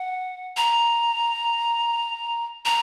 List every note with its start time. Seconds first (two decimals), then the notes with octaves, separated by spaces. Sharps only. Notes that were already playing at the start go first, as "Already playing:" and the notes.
Already playing: F#5
0.57 A#5
2.65 A#5